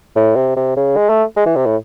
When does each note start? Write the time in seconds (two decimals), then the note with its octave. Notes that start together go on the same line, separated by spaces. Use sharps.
0.16 A2
0.36 C3
0.57 C3
0.77 C#3
0.97 G#3
1.10 A3
1.37 G#3
1.46 E3
1.56 C3
1.66 A2